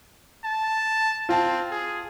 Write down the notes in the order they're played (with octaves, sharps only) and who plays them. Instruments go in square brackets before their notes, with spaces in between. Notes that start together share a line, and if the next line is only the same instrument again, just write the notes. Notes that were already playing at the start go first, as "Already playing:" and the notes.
[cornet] A5
[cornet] C4 [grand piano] F4 A5
[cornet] G#4